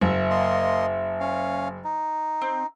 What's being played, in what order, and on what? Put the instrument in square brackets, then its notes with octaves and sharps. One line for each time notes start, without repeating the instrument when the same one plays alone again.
[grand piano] F#1 [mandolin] E5
[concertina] A#3 D#5 C6
C#4 F5
D#4
[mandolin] C4